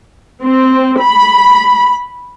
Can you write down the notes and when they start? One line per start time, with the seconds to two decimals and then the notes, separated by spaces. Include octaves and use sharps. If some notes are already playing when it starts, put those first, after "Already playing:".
0.41 C4
0.99 B5